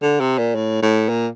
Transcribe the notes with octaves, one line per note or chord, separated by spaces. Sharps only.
D3
C3
A#2
A2
A2
A#2